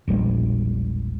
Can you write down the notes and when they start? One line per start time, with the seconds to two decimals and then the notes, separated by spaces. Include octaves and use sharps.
0.07 E1 A#1 G3 G#3